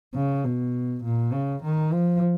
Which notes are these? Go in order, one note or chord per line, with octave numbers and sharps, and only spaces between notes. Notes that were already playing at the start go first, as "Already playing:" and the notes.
C#3
B2
A#2
C#3
D#3
F3